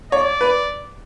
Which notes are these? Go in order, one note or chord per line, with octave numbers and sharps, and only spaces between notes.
C#5 D5
B4